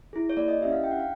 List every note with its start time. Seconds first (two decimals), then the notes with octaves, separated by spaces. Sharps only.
0.13 E4 G#4
0.30 C#5
0.37 A#3 D5
0.48 D#5
0.61 C#4 E4 G4 E5
0.72 F5
0.84 D4 G5
0.91 F#5
1.00 F5